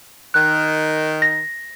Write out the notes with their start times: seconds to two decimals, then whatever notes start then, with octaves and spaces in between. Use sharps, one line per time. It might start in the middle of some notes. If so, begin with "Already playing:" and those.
0.34 D#3 F#6
1.22 A#6